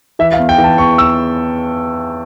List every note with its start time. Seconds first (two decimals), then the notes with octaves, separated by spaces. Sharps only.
0.19 E3 E5
0.33 F5
0.39 E2
0.49 G5
0.58 E3
0.64 A5
0.78 E2 C#6
0.98 E6